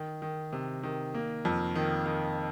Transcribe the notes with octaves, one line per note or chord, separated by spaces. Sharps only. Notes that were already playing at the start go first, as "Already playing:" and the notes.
Already playing: D#3
D#3
C3
D#3
A#3
F2
D#3
D#3